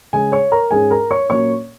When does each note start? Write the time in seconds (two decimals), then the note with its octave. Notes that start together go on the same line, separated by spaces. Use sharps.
0.13 C#3 G#3 C#4 G#4 G#5
0.32 C#5 C#6
0.52 A#4 A#5
0.71 G#2 G#3 C#4 G#4 G#5
0.90 A#4 A#5
1.11 C#5 C#6
1.30 A#2 F#3 A#3 C#4 C#5 C#6